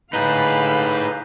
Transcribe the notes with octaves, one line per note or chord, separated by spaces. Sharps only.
A2 D3 D#4 G#4 B4 F5 B5 G6